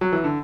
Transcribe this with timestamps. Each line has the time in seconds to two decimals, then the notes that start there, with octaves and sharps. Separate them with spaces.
0.01 F#3
0.12 E3
0.24 D3